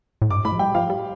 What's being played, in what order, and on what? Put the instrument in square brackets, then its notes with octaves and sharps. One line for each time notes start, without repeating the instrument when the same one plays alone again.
[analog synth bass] A2
[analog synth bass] G2 [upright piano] D6
[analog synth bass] A2 [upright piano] B5
[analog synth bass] F3
[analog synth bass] G3 [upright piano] G5
[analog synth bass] F3 [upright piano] F5
[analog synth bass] G3